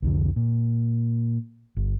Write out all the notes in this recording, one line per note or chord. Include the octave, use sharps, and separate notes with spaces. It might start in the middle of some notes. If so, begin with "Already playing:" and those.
C2 F2 D3
A#2
G1